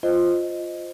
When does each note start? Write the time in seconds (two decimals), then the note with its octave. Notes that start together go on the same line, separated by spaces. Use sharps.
0.03 F4 C5 D#5